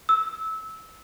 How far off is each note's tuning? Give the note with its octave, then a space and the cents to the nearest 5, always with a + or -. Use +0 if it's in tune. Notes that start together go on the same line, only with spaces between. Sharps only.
E6 -20